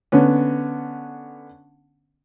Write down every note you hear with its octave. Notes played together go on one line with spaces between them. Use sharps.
D3 B3 C#4